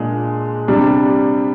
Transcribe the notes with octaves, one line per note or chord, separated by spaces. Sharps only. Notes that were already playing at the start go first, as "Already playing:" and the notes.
Already playing: A#2 G#3 D4
C3 G3 D4